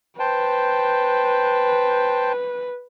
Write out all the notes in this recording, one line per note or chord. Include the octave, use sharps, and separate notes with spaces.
B4 C5 G5 A5